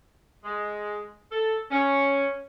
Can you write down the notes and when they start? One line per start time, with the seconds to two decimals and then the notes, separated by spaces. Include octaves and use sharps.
0.44 G#3
1.32 A4
1.71 C#4